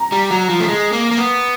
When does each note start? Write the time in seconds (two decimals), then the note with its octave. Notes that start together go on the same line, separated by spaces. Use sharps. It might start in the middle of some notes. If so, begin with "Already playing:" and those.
Already playing: A#5
0.12 G3
0.31 F#3
0.49 F3
0.60 A3
0.68 G#3
0.93 A#3
1.11 A#3
1.17 B3